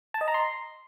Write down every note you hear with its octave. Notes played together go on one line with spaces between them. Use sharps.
A5
D#5
A#5
C6